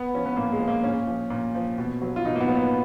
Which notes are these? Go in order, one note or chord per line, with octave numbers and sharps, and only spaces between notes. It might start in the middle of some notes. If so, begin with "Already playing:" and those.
Already playing: B3
F3 C#4
B3
A#2 A#3
G#3
F3
A#3
A#2 C#4
F3
A#2
F3
B2
F#3
F4
B2 D#4
A#3
B3
F#3
B3